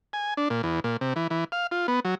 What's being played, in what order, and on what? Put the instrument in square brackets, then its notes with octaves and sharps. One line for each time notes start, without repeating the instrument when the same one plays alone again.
[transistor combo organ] G#5
D4
A#2
E2
A#2
C3
E3
E3
F5
F4
B3
F#3